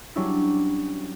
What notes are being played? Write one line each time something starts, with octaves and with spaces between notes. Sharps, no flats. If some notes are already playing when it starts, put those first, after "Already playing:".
F#3 G3 C#4 D4 E4